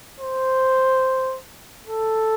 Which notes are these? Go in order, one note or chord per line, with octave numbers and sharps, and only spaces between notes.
C5
A4